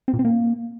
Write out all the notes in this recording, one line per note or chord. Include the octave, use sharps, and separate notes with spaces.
C4
A#2
C4
A#3